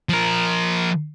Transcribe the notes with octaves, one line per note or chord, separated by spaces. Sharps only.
F3 A#4